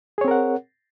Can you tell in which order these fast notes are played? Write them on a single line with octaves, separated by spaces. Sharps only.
G#4 C#5 C4 A#4 F#5